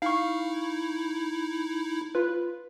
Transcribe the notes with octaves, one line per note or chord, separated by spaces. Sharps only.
D#4 E4 F5 C#6
F4 B4